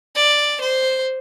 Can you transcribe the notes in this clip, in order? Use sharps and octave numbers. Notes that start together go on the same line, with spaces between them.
D5
C5